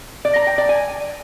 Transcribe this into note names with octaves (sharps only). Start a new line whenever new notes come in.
D5
A#5
G5
D5
G#5